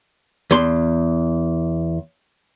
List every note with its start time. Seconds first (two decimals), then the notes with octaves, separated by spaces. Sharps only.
0.51 E2 C6